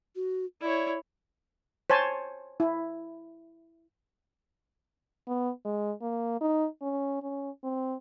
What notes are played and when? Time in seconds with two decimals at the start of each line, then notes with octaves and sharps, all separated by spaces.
0.16 F#4
0.62 E4 C#5 D5
1.90 C5 C#5 G#5 A5
2.60 E4
5.28 B3
5.65 G#3
6.02 A#3
6.41 D#4
6.82 C#4
7.22 C#4
7.64 C4